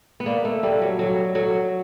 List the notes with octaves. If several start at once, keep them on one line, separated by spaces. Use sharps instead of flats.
B3
A#3 D5
A3
G3 A4
F#3
F#3 A4
F#3 A4